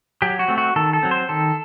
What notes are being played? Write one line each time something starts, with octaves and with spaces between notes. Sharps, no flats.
F#3 G4
F#4
A3 C4
F#4
D#3 A4
A4
F#3 C4
C5
D#3 A4